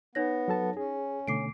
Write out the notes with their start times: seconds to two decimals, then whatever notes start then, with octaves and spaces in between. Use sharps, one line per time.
0.15 B3 D#4 C#5 A#6
0.48 F#3 A4 A5
0.77 C#4 G#4
1.28 B2 D3 A3 D6 C7 D7